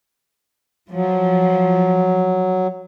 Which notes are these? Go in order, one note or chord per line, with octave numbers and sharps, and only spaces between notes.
F3 F#3